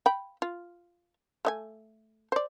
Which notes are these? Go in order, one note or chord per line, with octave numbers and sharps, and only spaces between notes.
G5 B5
F4
A3 D#5 G#5
C5 D5